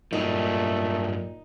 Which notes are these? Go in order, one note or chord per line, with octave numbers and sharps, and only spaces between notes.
G2 A#2 F#3 G3 A3 D#4